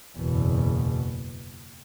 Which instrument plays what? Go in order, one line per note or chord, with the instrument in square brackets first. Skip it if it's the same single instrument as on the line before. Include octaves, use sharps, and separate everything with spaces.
[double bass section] F#1 E2 B2